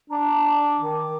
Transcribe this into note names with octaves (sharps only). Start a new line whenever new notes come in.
D4 A#5
D6
D#3 D6